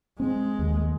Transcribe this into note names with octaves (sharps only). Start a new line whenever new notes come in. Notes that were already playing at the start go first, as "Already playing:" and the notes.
G#3 C4
D#2